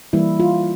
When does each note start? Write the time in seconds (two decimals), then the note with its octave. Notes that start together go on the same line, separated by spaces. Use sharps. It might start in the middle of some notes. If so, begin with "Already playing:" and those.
0.13 E3 G3 A#3 E4
0.40 F4